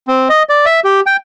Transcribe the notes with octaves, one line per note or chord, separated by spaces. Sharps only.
C4
D#5
D5
E5
G4
G5